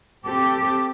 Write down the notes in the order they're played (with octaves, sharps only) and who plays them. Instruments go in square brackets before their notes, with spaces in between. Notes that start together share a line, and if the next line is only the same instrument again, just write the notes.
[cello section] C4 G4 A4 [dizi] D6